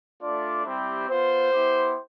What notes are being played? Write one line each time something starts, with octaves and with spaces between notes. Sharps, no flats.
A3 D4 F4 D5
G3 C4 E4 G4 C5
B3 F4 C5
B3 E4 G4